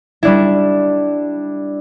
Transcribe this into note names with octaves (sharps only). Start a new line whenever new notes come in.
G3 D4 E4